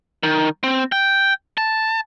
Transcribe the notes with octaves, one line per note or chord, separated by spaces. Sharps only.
D#3
C4
G5
A5